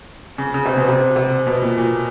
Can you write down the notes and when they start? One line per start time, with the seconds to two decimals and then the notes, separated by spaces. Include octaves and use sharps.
0.38 C#3
0.54 C#3
0.65 C3
0.77 B2
0.88 C3
1.16 C3
1.47 B2
1.62 A#2
1.78 A#2